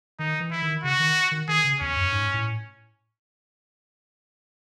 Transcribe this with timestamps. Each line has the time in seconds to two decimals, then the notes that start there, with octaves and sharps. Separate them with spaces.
0.19 D#3 D#4
0.40 E3
0.51 E4
0.62 D#3
0.84 C#3 F#4
1.00 D#3
1.31 D#3
1.48 D#3 G#4
1.64 C#3
1.80 E2 C#4
1.96 F#2
2.12 G#2
2.34 A2